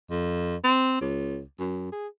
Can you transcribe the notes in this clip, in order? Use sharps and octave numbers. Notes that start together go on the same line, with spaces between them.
F2
C4
C#2
F#2
G#4